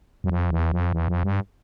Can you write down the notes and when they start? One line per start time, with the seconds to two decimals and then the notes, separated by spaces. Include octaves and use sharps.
0.24 F#2
0.30 F2
0.51 E2
0.72 F2
0.92 E2
1.08 F2
1.24 G2